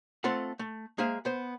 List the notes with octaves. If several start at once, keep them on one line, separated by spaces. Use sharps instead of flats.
A3 C4 F4 A4 F#5
A3
G#3 A#3 G#4 C5 E5 F5
B3 C5